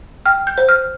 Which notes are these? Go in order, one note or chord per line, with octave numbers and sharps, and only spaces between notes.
G5 F6
G6
C5
F6